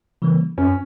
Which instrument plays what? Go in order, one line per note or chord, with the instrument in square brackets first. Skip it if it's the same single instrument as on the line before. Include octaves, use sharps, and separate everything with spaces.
[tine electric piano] C#3 E3 G3 A#3
[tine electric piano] F#2 [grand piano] C#4